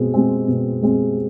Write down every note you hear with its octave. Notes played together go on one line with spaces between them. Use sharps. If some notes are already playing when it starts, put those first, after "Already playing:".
Already playing: B2 G#3 C4
G#3 C4
B2
G#3 C4